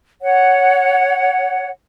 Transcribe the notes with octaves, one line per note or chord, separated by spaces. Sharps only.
C#5 F#5